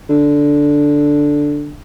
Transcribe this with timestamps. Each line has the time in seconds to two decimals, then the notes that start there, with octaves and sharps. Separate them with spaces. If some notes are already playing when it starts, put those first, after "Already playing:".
0.09 D3